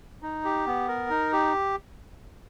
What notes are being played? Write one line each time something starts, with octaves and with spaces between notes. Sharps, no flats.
D#4
G4
B3
A#4
D#4
G4